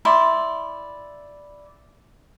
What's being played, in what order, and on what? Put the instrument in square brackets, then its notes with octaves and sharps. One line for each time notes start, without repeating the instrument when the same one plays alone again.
[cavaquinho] E4 D5 C6